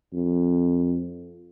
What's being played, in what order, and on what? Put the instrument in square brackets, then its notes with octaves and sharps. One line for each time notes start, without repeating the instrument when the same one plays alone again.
[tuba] F2